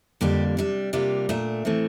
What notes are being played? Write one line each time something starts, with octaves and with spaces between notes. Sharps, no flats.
F2 D3 G3 A#3 D4 G4
C3 G3 D4
C3 G3 A#3 D4 F4
A#2 A3 D4
A2 E3 A3 C4